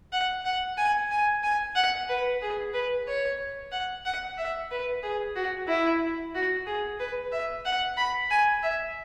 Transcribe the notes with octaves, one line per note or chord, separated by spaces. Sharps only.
F#5
F#5
G#5
G#5
G#5
F#5
B4
G#4
B4
C#5
F#5
F#5
E5
B4
G#4
F#4
E4
F#4
G#4
B4
E5
F#5
B5
G#5
E5